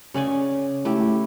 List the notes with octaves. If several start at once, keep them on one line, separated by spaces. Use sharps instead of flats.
C#3 C#4 D5 G#5
A3 E4 G4